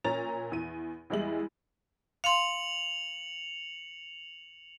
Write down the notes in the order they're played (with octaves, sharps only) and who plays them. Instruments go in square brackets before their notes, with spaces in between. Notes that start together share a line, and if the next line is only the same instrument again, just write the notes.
[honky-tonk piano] A#2 C#4 A#5 A6 F7
E2 D#7
E2 G3 G#3 E4 F#7
[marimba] F5 C6 [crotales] C#7 F7 F#7